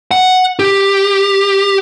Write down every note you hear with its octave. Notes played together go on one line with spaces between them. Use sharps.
F#5
G4